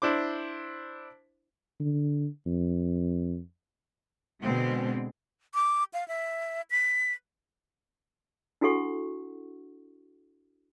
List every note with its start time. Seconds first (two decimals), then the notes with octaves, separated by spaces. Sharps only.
0.02 D4 E4 C5 D6
1.80 D3
2.46 F2
4.41 B2 D3 G#3 C4
5.55 D6
5.94 F5
6.08 E5
6.71 B6
8.61 D4 E4 F#4 A4 F#5 C#6